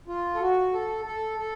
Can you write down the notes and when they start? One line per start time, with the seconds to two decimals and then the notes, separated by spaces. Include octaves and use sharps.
0.07 F4
0.35 A4
0.40 F#4
0.73 A4
1.05 A4
1.38 A4